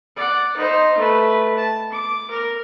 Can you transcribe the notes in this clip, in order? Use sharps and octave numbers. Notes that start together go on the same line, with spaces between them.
D5 F#5
D#4 C5
A3 B4
A5
D6
A#4